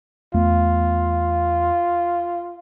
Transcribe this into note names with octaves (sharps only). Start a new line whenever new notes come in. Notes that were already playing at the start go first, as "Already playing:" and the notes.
E2 A3 B3 F4